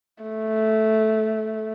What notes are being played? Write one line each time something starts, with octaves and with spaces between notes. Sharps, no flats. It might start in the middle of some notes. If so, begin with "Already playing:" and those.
A3